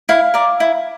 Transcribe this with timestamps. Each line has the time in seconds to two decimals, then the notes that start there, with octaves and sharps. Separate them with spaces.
0.09 E4 F5
0.34 A#4 D5
0.60 E4